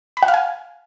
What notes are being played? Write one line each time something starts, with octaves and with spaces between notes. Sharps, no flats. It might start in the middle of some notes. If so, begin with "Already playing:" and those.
B5
F#5
F5
G#5